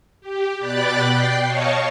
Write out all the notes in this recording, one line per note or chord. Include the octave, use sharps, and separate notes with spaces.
G4
B2 D5 G5 B5 F#6 A6
G5 C7
C#5 D#5 F5 A5 C#6